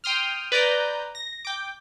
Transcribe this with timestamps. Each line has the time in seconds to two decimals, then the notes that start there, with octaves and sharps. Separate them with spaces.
0.04 G5 C6 D#6 F6
0.52 B4 D5 A#5 G6
1.15 A#6
1.45 G5 D6